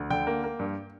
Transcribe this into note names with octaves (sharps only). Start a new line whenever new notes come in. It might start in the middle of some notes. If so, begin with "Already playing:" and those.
Already playing: D2
D3 G5
A#3
A#3
G2